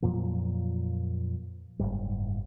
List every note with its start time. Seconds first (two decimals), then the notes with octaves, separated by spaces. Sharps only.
0.02 F2 A#2 F3 F#3
1.79 F#1 C2 G#2 G3